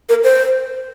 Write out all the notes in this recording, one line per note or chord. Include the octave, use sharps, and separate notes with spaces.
A#4
C5